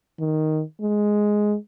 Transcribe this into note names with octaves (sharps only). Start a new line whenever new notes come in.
D#3
G#3